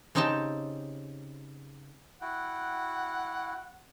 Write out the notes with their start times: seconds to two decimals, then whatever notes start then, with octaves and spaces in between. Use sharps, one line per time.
0.15 C#3 C4 D#4 G4 G5 A5
2.22 E4 F#4 F#5 G5